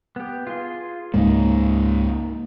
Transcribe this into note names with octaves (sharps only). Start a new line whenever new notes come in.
B3 G4
F4 G#4 C6
C#2 G#2 G#3 A#3 D#4